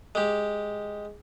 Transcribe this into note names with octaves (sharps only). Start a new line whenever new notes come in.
G#3 G4